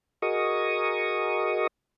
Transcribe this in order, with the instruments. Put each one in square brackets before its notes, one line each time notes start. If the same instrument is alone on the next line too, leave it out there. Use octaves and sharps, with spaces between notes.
[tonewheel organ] F#4 G#4 A#4 D#5 C#6 D#6